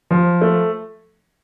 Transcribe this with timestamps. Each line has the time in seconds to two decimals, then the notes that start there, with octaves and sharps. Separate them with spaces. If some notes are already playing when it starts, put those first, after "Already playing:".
0.11 F3
0.41 A3